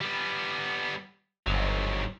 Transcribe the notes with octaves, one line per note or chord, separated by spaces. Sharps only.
G3 B3
G1 G#2 F#3